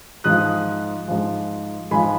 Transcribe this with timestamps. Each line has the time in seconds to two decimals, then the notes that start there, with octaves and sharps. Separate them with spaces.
0.24 G#2 F3 D#6 F#6
1.08 G#2 F3
1.91 G#2 F3 G#5 B5